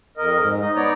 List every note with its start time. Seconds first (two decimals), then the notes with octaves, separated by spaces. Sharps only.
0.17 F2 A#4 D#5
0.39 G#2
0.61 D#4 D#5
0.76 B3 D#4 C#5 D5 A#5